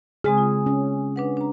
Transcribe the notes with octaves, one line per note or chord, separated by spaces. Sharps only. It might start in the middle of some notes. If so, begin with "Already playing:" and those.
C#3 G#3 C4 G#4
F4
C#4
D4 B4 F#5
D4 A#5